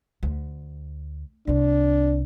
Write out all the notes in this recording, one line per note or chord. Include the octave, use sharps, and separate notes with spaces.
D2
C2 C4 D4